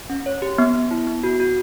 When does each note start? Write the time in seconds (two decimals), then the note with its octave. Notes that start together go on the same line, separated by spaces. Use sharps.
0.10 C#4
0.26 C#5
0.42 G4
0.58 B3
0.74 B3
0.91 E4
1.07 B3
1.23 F#4
1.40 F#4